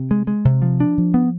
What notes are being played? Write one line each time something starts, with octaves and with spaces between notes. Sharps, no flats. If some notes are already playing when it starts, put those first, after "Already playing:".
Already playing: C3
G#3
G#3
C3
F3
D4
F3
B3